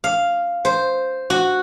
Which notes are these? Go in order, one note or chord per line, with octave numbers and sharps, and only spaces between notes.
F5
C5
F#4